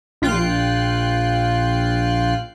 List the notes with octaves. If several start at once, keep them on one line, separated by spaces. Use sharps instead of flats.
A#1 F4 G5 F#6 C7